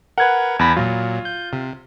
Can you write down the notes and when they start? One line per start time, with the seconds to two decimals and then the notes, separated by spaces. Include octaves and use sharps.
0.18 A#4 B4 F#5 G#6
0.59 E2 A5 B5 A#6 B6
0.76 A#2 F#3 F4
1.25 G6
1.53 C3